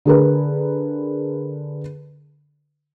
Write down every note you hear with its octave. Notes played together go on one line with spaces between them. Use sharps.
D3 G#4 A#4 B4